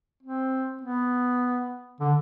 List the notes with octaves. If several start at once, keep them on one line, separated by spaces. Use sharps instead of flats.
C4
B3
D3